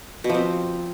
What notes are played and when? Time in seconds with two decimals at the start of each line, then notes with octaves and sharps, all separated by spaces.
0.24 B2
0.29 F3
0.35 C4